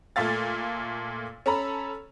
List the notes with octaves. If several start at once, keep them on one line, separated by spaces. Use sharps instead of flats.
A#2 A3 F5 A6
C#4 A4 A#5 B5